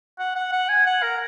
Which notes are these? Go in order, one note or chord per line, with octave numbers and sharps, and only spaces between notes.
F#5
F#5
F#5
G#5
F#5
A#4